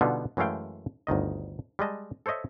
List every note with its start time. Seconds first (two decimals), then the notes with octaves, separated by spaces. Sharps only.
0.01 B2 D3 G3 B3 D#4 F4
0.37 F#2 E3 G#3 A3 F5 G5
1.07 G1 D2 D#3 D#5
1.79 G3 G#3 D#5 A5
2.26 A4 C5 C#5 D#5 E5